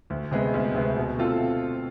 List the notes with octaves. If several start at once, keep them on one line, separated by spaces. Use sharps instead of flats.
D2
C3 G#3 B3
D2
C3 G#3 B3
B2
A3 C4 F4 A4